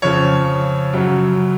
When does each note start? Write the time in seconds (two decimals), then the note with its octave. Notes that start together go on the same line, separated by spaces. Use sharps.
0.02 F2 C#3 F3 C#5
0.93 F#2 C#3 F#3